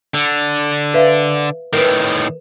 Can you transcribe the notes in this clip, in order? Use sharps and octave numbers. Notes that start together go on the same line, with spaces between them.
D3
B4 E5 F5
A2 D#3 A#4 B4